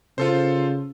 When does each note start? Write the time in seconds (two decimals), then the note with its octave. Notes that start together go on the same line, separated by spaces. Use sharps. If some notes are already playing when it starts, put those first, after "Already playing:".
0.18 C#3 F4 A4 C5